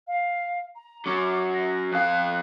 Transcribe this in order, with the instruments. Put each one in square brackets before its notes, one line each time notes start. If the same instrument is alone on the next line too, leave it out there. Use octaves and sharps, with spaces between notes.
[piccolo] F5
A#5
[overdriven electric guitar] F#3 C#4 [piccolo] D6
[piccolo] A#6
[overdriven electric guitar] F2 F5 [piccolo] F#6